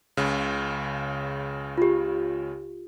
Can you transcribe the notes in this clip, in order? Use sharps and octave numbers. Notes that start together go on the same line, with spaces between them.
C#2 C#3
F4 G4